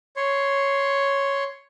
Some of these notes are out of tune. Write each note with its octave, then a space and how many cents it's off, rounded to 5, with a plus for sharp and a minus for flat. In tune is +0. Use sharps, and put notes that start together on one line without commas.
C#5 +0 C6 +0